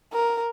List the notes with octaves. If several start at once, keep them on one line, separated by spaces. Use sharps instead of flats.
A#4